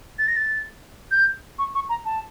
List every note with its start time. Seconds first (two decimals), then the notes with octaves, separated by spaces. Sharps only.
0.19 A6
0.28 A#6
0.36 A6
1.11 G6
1.59 C#6
1.75 C#6
1.89 A#5
2.05 A5